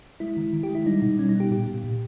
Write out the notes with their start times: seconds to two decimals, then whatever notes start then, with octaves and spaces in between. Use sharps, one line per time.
0.20 G#3 E4
0.37 D#3
0.53 D#3
0.63 G4
0.69 G#3
0.75 E4
0.86 G3 D#4
1.02 B2
1.19 G3 C#4
1.29 D#4
1.35 B3 G4
1.51 A#2 G4
1.67 A#2
1.84 A#2